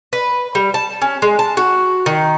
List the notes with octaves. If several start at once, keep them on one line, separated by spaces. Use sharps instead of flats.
B4
G3
A5
C#4
G#3
A5
F#4
D#3